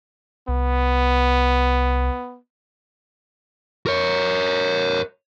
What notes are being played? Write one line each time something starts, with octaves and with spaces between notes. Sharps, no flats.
C2 B3
A#4 C#5